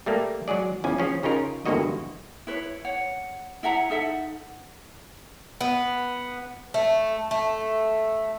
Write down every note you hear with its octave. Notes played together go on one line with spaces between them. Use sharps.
G3 A3 A#3
F#3 G#3 G#4 D5
E2 C#3 F3 C#4 G#5
F3 C#4 G#4
C#3 C#4 D#4 F4 A#4
G1 E2 G2 A#3 F#4 D#5
E4 B4 C#5
C#5 F#5
E4 E5 F#5 A#5
D#4 A4 E5 F#5
B3
A3
A3